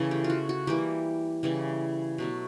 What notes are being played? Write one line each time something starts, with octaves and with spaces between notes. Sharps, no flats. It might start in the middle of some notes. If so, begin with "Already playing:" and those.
Already playing: C#3 E3 A3 A4
G4
F4
F#4
F#4
E3 G3 A#3 G4
C#3 E3 G3
B2 F#3 A3